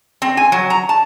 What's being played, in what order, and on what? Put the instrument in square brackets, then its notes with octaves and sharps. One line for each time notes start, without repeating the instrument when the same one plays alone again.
[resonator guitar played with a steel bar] C4
G#5
F#3
A#5
A5